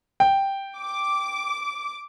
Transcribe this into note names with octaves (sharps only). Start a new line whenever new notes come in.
G5
D6